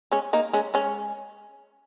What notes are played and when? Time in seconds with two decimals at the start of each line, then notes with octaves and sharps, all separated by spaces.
0.11 G#3 C#4
0.33 A#3 D#4
0.53 G#3 C#4
0.74 G#3 C#4